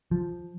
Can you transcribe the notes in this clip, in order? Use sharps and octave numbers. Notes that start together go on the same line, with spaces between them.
F3